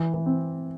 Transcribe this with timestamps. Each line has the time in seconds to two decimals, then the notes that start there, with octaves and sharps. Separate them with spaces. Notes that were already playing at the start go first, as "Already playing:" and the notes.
Already playing: E3
0.14 E3
0.26 C4